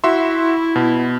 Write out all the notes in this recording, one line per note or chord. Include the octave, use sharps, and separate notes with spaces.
E4 F#4 E5 C6
B2